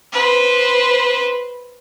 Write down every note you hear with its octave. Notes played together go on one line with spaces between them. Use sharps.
B4 C5